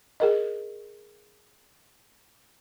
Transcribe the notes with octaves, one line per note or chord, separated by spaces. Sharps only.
G#4 A#4 D#5